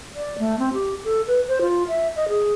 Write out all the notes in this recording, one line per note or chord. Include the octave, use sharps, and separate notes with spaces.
D5
A3
C4
G4
A4
B4
C5
F4
E5
D#5
G#4